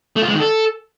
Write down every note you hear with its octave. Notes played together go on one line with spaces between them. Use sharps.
A3
F4
G#3
D#3
A4